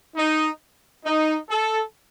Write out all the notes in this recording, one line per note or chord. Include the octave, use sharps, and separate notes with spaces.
D#4
D#4
A4